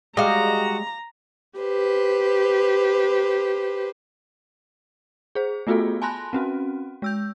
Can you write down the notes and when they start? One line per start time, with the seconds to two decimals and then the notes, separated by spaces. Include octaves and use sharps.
0.17 G3 G#3 F#4 G4 D#5 F5 A#5
1.58 G4 B4 C5
5.35 G#4 C5
5.67 A3 B3 F4 F#4 G#4 A4
6.02 G#5 A5 B5 C6 F#6 A#6
6.33 C4 C#4 F#4
7.02 G#3 E6 G6